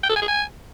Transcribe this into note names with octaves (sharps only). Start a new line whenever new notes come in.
G5
A4
G#5
G#4
G#5